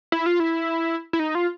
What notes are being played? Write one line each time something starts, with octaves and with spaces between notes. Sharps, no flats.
E4
F4
E4
E4
D#4
F4